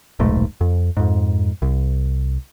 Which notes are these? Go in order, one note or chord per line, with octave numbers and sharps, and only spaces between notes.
D#1 B1 G#2 A3
F2
F2 G#2
C2